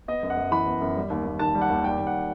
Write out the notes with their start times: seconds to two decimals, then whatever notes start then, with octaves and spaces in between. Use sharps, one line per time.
0.08 B3 D#5
0.23 F#2
0.30 F#5
0.37 F#2
0.51 E3 B5
0.66 B3
0.82 F#2
0.96 G3
1.10 D#2
1.26 D#2
1.39 D#3 A5
1.55 G3
1.62 F#5
1.70 D#2
1.84 G3 G5
1.99 D#2
2.07 F#5